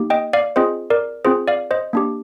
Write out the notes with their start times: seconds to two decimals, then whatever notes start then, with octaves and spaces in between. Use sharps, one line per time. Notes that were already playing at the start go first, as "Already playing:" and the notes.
Already playing: A#3 D#4 G4
0.10 D#5 G5
0.33 D5 F5
0.56 C4 F4 G#4 C5 D#5
0.90 A#4 D5
1.25 C4 F4 G#4 C5
1.48 D5 F5
1.71 C5 D#5
1.93 A#3 D4 G4